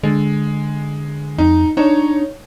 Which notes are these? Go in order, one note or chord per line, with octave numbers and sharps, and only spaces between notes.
D3 G#3
F2 D#4
D4 D#4 C#5